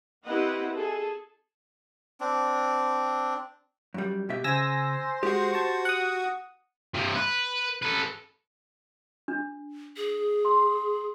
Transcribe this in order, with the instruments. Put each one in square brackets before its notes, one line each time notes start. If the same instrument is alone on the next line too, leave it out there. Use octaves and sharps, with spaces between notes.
[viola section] C4 E4 G4 B4 D#5 F#5
G#4 A4
[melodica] C4 D4
[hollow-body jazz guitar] F#2 G3
B2 G4 E5
[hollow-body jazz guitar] C#3 [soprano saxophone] C5 [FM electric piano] G#5 E6 A#6
[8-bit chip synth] G#3 F#4 [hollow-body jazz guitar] G4
[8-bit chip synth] F#4 [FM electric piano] A5 C#6
[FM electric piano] F#5 D#6
[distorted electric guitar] G2 C3
B4
A4 B4
[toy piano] D4
[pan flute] G#4
[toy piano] C6